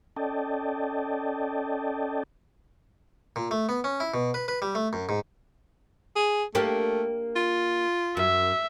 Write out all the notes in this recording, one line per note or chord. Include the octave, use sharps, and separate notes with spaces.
C#4 A4 D5 D#5 G5 A5
A#2
A3
B3
C#4
E4
B2
B4
B4
G3
A3
F#2
G#2
G#4
A3 A#3 D4 G4
F4
F#2 E5